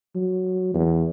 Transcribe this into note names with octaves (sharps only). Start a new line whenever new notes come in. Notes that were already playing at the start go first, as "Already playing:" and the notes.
F#3
E2